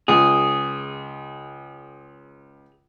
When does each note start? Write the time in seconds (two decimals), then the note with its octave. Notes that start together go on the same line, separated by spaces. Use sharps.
0.08 C#2 G#4